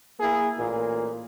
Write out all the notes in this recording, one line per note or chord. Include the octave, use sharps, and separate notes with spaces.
A#3 E4 G#4
A1 A#2